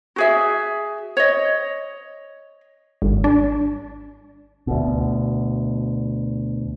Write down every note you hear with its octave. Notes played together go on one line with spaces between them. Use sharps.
F#4 G#4 E5
C#5 D#5
G#1
D4
D2 B2